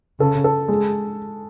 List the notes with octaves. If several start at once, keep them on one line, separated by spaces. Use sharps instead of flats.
C#3 A4
A4
G#3